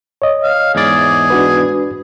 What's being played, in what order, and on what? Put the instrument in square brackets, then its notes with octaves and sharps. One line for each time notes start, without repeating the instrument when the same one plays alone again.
[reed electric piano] C#5 D#5
[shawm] F5
[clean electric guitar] E2 G#2 D5 [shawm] G#4
[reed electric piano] D4 F#4 B4